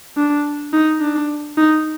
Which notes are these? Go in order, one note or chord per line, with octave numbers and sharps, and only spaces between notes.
D4
D#4
D4
D#4